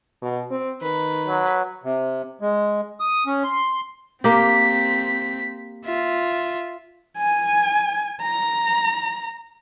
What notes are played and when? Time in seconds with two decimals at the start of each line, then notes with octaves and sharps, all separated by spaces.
0.22 B2
0.50 C4
0.82 D#3 B4
1.28 F#3
1.84 C3
2.41 G#3
3.00 D#6
3.26 C#4
3.44 C6
4.24 A#3 C4 G4 B6
5.85 F4 E5
7.18 G#5
8.22 A#5